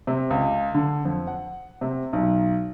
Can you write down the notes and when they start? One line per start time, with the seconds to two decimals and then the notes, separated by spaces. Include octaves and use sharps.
0.07 C3
0.30 C#2
0.75 D3
1.05 F2
1.27 F#5
1.81 C3
2.13 B1